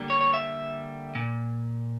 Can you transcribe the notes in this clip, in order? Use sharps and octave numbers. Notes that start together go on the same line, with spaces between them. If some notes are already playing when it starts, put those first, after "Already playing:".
Already playing: D3 G3 A#3
C#5
C#5
E5
A#2